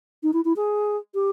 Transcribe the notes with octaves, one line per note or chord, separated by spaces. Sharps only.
D#4
E4
E4
G#4
G4